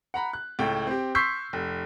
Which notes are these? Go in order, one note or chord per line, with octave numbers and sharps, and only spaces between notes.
F#5 A#5 B5
F#6
C#2 A2 G5
C4 G4
C6 C#6 E6 G6 B6 C7
F1